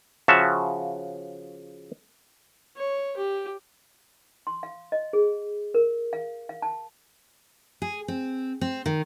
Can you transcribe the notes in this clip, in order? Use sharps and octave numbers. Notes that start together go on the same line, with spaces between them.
C#3 F3 F#4 E5 A5
C#5
G4
C6
F5
D#5
G#4
A#4
F5
F5
A5
G#4
C4
C4
D#3